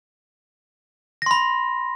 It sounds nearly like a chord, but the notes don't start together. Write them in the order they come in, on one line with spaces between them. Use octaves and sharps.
A#6 C6 B5